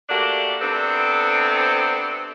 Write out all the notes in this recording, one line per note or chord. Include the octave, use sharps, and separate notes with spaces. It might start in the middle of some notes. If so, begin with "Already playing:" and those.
A3 A#3 D4 F#4 G4
C3 B3 C4 D4 A4